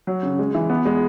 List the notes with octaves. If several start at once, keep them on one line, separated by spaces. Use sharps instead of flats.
F#3
C#3
G#3
E3
B3
G#3